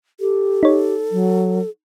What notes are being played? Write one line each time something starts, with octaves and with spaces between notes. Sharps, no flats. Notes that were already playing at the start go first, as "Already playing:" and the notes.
G4 A4
D#4 C#5
F#3